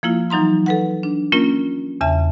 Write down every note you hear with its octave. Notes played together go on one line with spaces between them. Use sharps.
F3 A#3 E4 F4
E3 F#3 D#4 A#5 C6
A4 B4 F#5
D4
A#3 C#4 F4 A#4
E2 C#3 E5 A5